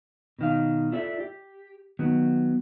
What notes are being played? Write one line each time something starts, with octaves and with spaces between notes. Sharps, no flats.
B2 D#3 F5
E4 F4 A4 D5 E5
G4
D#3 F#3 B3